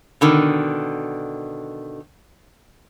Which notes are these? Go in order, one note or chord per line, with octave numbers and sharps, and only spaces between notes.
B2 D3 D#3